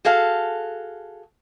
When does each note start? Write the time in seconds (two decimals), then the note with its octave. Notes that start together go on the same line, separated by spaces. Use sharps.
0.05 F#4 G#4 A4 F5